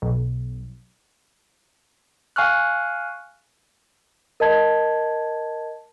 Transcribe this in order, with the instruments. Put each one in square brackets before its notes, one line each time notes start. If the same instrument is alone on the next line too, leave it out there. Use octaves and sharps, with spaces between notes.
[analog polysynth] B1
[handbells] F5 G#5 C#6 F6 F#6
[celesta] A#4 D#5 A5 G#6